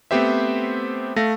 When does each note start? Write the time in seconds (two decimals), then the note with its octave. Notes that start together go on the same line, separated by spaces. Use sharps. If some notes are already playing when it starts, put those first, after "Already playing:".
0.11 A3 B3 C4 G4 C5 E5
1.16 A3 F5 A#6